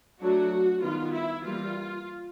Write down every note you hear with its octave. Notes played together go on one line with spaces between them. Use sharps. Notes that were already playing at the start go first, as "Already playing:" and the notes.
F#3 A3 D4 F#4
D#3 G3 B3 F4
E4
E3 G3 A#3 F4